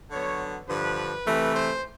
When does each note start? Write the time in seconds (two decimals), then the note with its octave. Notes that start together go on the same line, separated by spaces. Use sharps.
0.11 D3 F#3 B3 C#5
0.68 G2 D3 F3 B4
1.25 C3 E3 A3
1.54 C5